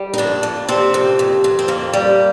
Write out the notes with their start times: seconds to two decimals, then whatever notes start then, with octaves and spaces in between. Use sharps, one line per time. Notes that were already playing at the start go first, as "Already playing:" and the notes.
Already playing: G3
0.13 D#4
0.18 F2 D4
0.43 F2
0.69 C3 C4
0.94 F2
1.19 F2
1.44 F2
1.59 C4
1.68 F2 A#3
1.93 G3